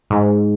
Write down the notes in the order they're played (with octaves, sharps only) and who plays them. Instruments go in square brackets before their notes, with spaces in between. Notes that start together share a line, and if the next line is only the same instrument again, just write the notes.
[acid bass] G#2